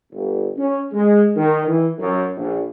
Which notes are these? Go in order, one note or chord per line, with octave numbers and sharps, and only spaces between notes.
G1
C#4
G#3
D#3
E3
F#2
A#1